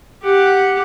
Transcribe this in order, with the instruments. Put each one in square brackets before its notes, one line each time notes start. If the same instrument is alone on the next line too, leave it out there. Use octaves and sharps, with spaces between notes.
[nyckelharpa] G4 F#5